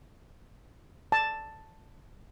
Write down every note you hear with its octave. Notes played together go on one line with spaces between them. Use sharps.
A5